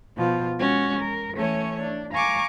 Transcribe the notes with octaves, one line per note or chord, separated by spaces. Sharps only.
B2 F3 F4
G#3 C#4 F#4
A#4
E3 A3 C#4 C#5
D4
F5 G#5 A#5 C#6 D6